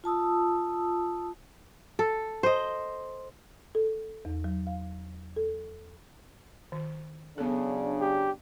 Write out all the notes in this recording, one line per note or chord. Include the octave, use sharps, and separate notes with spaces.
F4 A5 D#6 E6
A4
C5 D#5
A4
E2
F#3
F5
A4
D#3
C#3 F#3 B3 D4 A4
G4